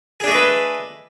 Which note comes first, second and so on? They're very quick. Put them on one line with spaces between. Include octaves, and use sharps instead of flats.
G#4 D4 A3 D#5 B4